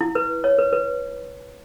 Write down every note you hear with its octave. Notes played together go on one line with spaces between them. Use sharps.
E4
B4
C#5
B4
B4